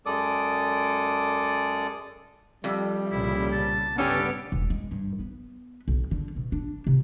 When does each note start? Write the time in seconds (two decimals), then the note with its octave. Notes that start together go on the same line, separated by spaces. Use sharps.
0.06 F#2 G#3 A4 D5 D6 D#6
2.64 F2 G3
3.10 C2 A#2 C#3 E4
3.52 A5
3.98 G1 C#3 B3 C#4 D4 G4 A4
4.52 E1
4.70 G#3
4.91 G2
5.19 B3
5.88 B1
6.11 D3
6.36 B2
6.52 D4
6.87 C3